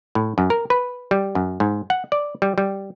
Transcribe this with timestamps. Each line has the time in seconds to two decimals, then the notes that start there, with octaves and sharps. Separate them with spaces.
0.15 A2
0.38 F#2
0.50 A#4
0.70 B4
1.11 G3
1.35 F#2
1.60 G#2
1.90 F#5
2.12 D5
2.42 G3
2.58 G3